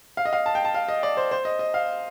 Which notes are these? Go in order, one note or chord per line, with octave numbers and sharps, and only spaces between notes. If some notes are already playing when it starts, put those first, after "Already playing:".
F5
D#5
F5
A5
G5
A5
F5
D#5
D5
C5
C5
D#5
D#5
F5